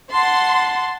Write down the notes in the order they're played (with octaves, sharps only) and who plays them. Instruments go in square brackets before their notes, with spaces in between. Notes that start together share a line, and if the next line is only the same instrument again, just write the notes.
[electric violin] F#5 A5 [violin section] C6